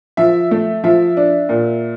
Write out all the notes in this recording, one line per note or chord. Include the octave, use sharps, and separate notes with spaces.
F3 E5
A3
F3 E5
D4
A#2